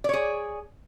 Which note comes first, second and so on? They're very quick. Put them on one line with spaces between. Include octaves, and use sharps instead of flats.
D5 C#5 G#4